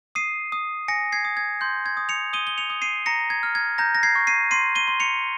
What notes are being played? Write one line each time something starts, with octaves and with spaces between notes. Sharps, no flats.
D#6 C7 D#7
D#6
G#5 A#6 C#7
G#6 C7
D#6
G#6
C6 G6
G#6
D#6
C#7 F7
D#6 D#7 G7
G7
C#7 F7
D#6
C7 D#7
A#5 A#6 C#7
G#6
F6
G#6
A#5 G6 A#6
A#6
G#6 C7
C#6
C7 D#7
C6 C7 D#7
D#7 G7
C6
C#7 F7